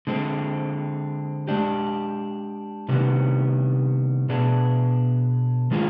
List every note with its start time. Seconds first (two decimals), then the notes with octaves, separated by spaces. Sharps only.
0.07 D3 G#3 C4
1.48 G#3 D4 G4
2.88 C3 D#3 G3 B3 D4
4.29 B2 B3 D4 G#4
5.71 D#3 G#3 D4 F4 G#4